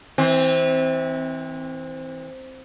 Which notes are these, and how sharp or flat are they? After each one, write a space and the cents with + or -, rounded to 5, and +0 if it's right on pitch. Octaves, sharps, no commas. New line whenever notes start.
E3 -30 C4 +0